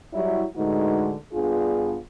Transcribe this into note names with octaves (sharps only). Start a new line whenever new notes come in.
F#3 G3 E4
A2 D3 G#3 D#4 F#4 B4
G2 B3 D4 F4 G#4